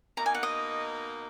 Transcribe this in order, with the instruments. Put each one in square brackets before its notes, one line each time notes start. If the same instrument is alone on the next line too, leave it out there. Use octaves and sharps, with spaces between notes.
[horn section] B2 A#3 D#4 [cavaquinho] A#5
[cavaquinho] G#5
F#5
D#5